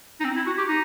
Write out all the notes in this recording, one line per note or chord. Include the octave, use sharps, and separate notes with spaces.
D#4
C4
E4
F#4
G4
D#4